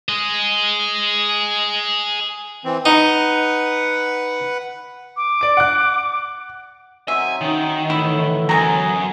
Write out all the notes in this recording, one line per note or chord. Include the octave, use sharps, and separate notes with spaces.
G#4 D#5
E3 C4
D#4 B4 F#5
D6
D5 D7
F#5 F#6
D#3 F#3 C4 E5 G#5
D#3 C#4 D#4 D#5
A2 D3 E3 E4
F#2 B3 F#4 A#4 G#5 A#5